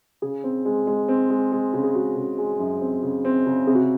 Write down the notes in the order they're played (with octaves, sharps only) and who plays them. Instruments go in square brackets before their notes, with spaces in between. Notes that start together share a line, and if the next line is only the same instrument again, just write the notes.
[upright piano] C#3 [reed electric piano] G#4
[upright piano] C4
G#3
G#3
C4
G#3
G#3
C#3
[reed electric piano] G#4
[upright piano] G#3 [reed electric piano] F#4
[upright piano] C#3
G#3
F#2
C4
C#3
C4
C#3
[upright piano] C3 [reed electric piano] G#4
[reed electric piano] F#4